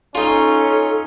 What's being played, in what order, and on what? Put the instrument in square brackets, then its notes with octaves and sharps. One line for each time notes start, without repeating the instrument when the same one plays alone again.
[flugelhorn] C#4 [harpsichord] D#4 F4 [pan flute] A4